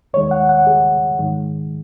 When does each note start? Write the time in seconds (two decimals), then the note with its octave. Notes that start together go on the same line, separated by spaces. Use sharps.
0.13 D#2 D#3 G#3 C#5
0.31 F#5
0.49 F#5
0.67 G#4
1.19 G#2 D#3 G#3